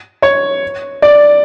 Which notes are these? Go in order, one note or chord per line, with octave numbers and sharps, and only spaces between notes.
C#5
D5